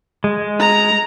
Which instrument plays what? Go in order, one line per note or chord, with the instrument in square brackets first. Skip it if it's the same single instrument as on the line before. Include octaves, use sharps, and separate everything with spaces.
[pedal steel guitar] G#3
[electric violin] A#5